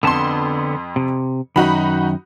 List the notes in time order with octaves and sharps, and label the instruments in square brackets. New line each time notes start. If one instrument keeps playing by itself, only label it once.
[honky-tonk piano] F2 C6 [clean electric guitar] D3 B3 A5
[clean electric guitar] C3
[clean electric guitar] F#2 D#3 [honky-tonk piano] D#4 F#4 B5